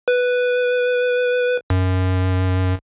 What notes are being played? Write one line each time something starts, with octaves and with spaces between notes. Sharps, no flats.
B4
F#2